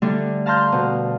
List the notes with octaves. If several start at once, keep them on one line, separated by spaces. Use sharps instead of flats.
D3 G3 A3 D4 D#4
F5 A5 A#5 C6 F6 G6
B2